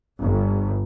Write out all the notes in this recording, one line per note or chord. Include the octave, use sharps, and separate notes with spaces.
G1